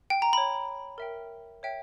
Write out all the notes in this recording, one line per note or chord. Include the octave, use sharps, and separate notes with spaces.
G5
A#5
C#5 G5 B5
A#4 E5 G5
C#5 E5 G5